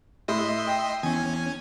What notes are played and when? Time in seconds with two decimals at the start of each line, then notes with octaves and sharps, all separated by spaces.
0.28 A2 D#5 E5 C6
0.67 G5
1.03 E2 C#4 G#5